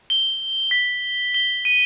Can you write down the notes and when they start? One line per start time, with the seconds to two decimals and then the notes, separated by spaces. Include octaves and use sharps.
0.10 G7
0.71 B6
1.34 G7
1.65 D#7